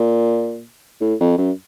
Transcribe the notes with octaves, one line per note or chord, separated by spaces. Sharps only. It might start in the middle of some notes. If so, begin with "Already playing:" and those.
Already playing: A#2
A2
F2
F#2